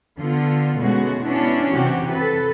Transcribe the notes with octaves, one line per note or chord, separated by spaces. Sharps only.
D3 B3 F4
B2 G#3 A3 C#4 F#4
B3 C#4 D4 E4
C3 E3 F#4 G4
A4 B4